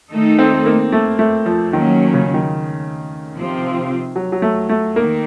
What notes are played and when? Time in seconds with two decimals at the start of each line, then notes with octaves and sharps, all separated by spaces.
0.11 D#3 A3 D#4 A4
0.39 C4
0.66 A#3
0.93 A3
1.19 A3
1.46 F3
1.73 D#3 F#3 A#3 C#4
2.14 C#3
2.34 D#3
3.35 C3 F3 C4 F4
4.16 F#3
4.32 F#3
4.42 A3
4.69 A3
4.96 D#3 A#3